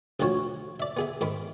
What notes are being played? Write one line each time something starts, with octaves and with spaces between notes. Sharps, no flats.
A1 D2 F3 F#4 C#5
D5 E5
B3 G#4 E5
G#2 D#3 B5